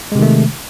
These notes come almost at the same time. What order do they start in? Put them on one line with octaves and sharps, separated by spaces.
G#3 C3 D#3 A3